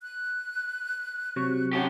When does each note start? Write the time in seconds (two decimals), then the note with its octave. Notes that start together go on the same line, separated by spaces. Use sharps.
0.02 F#6
1.36 C3 F#3 C#6
1.73 C#4 G4 F#5